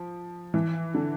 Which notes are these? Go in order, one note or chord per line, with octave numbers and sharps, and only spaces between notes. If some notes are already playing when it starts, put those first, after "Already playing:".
Already playing: F3
E3
D3